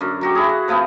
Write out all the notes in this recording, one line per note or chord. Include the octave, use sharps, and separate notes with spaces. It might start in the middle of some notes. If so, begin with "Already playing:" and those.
F#2 D3
F#3 F#4 G4
E4 G#4
F#5
F3 A3 B3 C4